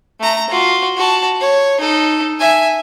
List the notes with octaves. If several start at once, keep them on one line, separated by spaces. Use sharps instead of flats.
A3 A#5
F4 F#4
F#4 A5
C#5
D#4 A4
E5 G#5